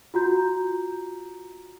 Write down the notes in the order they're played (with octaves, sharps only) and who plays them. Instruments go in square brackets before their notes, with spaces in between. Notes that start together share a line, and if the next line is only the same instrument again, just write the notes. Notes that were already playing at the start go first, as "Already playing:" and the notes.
[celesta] F4 F#4 A#5 G6